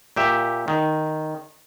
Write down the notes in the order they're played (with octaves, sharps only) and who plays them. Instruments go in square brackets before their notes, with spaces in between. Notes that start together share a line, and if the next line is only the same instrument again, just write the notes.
[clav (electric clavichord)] A#2 G4 E5
D#3